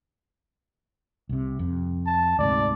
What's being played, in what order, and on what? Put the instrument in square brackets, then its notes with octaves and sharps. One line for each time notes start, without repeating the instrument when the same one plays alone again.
[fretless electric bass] C2 C3
F2
[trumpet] A5
[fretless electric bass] D2 G#2 C3 [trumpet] D5